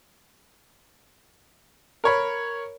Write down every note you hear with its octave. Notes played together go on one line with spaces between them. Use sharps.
A#4 C#5 B5